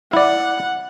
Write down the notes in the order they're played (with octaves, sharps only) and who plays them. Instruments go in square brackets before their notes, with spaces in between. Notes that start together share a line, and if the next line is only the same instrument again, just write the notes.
[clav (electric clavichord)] E4 D5 [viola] F#5